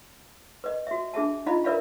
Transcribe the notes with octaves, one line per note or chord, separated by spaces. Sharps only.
B4 D#5
F#4 E5
D4 G#4 E5 A5
D#4 F4 D#5 F5 A#5 B5
A#4 B4 D5 E5 F5 B5